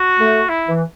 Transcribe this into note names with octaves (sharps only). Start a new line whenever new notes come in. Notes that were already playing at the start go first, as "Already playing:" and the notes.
Already playing: F#4
A3
E4
E3